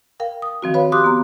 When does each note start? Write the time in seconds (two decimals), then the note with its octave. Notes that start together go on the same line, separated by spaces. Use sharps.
0.20 A#4 F5 G5
0.42 D#6
0.62 D#3 F3 C4 F#4
0.74 B4 C#5 F5 B5
0.92 G4 C6 D6 D#6 F#6
1.04 B3 A#5